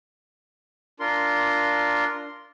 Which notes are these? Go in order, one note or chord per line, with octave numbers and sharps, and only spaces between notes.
D4 F4 A#4 C6